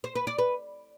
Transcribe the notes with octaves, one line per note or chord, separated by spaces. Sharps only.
C5
B4
D5
B4